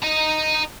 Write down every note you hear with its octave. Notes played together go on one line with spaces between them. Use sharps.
D#5 A#5